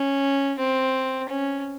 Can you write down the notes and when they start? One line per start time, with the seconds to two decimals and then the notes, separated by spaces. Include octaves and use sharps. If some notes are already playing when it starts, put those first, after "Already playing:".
Already playing: C#4
0.59 C4
1.29 C#4